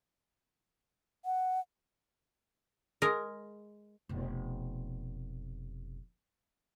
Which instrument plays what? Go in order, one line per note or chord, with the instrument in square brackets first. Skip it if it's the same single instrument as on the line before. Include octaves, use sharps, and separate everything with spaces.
[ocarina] F#5
[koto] G#3 A#4
[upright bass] F1 B2